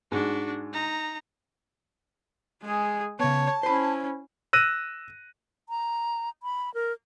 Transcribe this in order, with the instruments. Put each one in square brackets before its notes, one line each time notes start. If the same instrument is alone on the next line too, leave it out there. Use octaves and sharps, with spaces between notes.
[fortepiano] G#2 [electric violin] D4 F#4
[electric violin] D#4 A#5
[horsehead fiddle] G#3 G#4
[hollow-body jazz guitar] C#3 B3 [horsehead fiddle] C#5 [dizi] A5
[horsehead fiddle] C#4 E4 [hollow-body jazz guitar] C5 B5
[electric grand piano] E6 F#6 A#6 D#7
[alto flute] A#5
B5
A#4